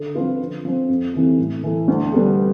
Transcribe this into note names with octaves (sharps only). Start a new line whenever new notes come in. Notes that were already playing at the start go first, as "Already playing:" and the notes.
Already playing: D3
F3 C4 F4 B4
D3
F3 C4
F2
C3 E3 A3
A2
E3 A3
D2
D3 G3 B3